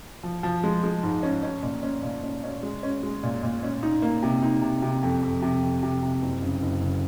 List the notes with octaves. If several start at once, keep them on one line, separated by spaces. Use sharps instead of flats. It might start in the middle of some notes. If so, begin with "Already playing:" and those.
F3
F3
G#3
G#3
G#2
C#4
C#4
A#2
C#4
A#2
C#4
C#4
G#3
C#4
G#3
A#2
A#2
C#4
D#4
A#3
C3
D#4
C3
C3
F2
F2
C3
F2
C3
C3
F#1
C#3
F#1
C#3